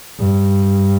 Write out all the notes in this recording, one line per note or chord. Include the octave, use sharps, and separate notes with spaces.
G2